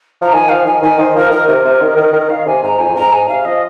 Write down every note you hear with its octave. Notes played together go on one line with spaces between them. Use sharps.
F3 A#5
D#3 G#5
F3 F5
D#3 G#5
D#3 G#5
D#3 C5
F3 A#4
D#3 A#4
C3 A#4
C3
D#3
D#3
D#3
D#3 F5
C3 G#5
G#2 A#5
F2 G#5
F2
G#2 A#5
G#2 G#5
C3 F5
F3 D#5